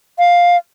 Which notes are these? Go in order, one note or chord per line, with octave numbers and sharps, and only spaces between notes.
F5